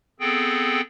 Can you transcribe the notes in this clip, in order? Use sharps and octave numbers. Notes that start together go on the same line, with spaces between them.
B3 C4 G#4 A4 G5